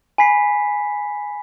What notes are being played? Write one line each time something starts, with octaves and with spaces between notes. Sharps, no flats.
G#5 B5 B6 C7